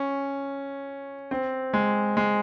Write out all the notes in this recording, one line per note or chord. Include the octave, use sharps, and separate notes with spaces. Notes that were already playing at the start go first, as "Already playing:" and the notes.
Already playing: C#4
C4
G#3
G#3